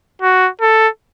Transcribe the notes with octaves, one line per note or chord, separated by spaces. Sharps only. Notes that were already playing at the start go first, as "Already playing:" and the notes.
F#4
A4